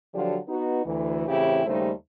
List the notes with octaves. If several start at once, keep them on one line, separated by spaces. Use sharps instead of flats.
D3 F3 F#3 D4 F4 G4
B3 D#4 F#4
D2 E3
A2 C#3 E3 C4 E4 G4
D#2 C#3 G3 A3 D#4 C5